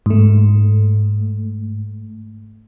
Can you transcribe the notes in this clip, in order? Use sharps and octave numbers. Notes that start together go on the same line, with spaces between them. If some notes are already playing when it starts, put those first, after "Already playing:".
G#2 A3